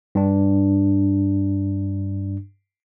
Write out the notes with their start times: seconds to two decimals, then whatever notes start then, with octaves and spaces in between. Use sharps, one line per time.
0.15 G2 D4